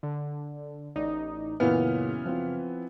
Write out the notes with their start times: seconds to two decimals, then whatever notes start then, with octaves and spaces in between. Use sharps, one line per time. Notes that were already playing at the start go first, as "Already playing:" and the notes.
0.03 D3
0.96 A1 D#4 D5
1.60 F#2 A#2 C#3 E3 B3 F6
2.25 F3 C4 F4